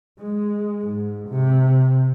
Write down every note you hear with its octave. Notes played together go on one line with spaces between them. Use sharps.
G#3
G#2
C3